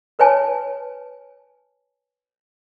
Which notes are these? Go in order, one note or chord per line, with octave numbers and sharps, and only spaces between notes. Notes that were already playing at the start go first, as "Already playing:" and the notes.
A#4 B4 C#5 G#5 A5